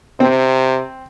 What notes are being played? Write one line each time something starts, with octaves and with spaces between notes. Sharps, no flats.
C3 C4